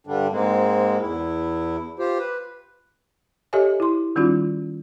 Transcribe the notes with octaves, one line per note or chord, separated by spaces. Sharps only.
G2 D3 G3 D4
G#2 G#3 A#3 C4
E2 E4
F4 G4 C5
B4
G4 A4 C#5 D#5 E5 G#5
E4 C6
D#3 G3 C#4 D#4 F4 F#4